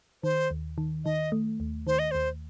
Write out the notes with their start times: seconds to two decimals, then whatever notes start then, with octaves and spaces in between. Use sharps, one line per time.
0.23 D#3 C5
0.51 D#2
0.78 D#3
1.05 D#3 D#5
1.32 A3
1.60 D#2
1.87 D#3 C5
1.99 D#5
2.11 D#2 C5